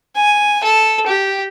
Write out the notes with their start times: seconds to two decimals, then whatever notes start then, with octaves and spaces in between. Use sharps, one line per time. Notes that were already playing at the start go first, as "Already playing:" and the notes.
0.16 G#5
0.64 A4
1.07 G4